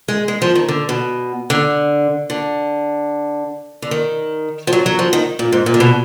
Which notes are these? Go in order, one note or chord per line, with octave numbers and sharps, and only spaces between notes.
G#3
G#3
F3
D#3
D3
B2
D3
D3
D3
D#3
F3
F#3
F#3
F3
D#3
A#2
G#2
A#2
D3
B2